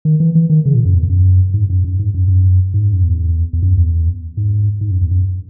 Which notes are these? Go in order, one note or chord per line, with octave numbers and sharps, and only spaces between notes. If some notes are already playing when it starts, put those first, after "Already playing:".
D#3
E3
E3
D#3
C#3
A#2
F#2
E2
F#2
G#2
F#2
F#2
G#2
F#2
F#2
G#2
F#2
E2
E2
F#2
E2
G#2
G#2
F#2
E2
F#2